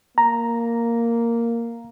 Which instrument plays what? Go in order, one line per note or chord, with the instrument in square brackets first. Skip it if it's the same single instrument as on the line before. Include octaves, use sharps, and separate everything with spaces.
[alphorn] A#3 [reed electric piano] A#5